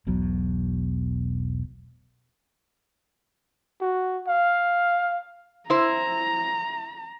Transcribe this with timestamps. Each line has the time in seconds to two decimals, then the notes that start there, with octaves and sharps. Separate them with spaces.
0.07 E1 B1 B2 F#3
3.81 F#4
4.27 F5
5.70 E4 C5 A#5